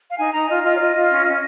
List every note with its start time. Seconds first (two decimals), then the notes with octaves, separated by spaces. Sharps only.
0.09 F5
0.18 D#4 G#5
0.33 D#4 A#5
0.48 F4 D#5
0.63 F4 D#5
0.75 C#5
0.80 F4 D#5
0.95 F4
1.11 C#4
1.26 C#4